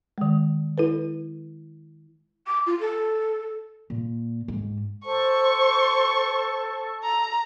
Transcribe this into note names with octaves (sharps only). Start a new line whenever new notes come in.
D#3 G#3
E4 A4 B4
D6
F4
A4
A#2
G#2
A4 C5 C#6
A#5